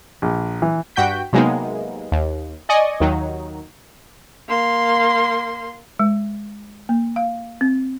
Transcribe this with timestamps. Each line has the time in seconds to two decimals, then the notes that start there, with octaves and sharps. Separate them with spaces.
0.22 A#1
0.62 E3
0.96 G2 F#4 G5 G6 B6
1.33 C3 F#3 G#3 A#3 B3 D#4
2.12 D#2
2.69 D5 D#5 G#5 C#6 D#6
3.00 D#2 D#3 F#3 D#4
4.49 A#3 C6
6.00 G#3
6.89 A#3
7.16 F5
7.61 C4